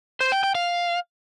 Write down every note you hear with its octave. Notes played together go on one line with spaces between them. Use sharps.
C5
G5
G5
F5